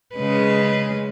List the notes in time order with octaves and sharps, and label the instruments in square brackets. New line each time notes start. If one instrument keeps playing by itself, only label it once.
[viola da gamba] C#3 G#3 B4